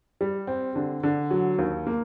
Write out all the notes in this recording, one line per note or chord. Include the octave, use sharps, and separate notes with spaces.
G3
C4
D3
D3
F#3
D#2
A#3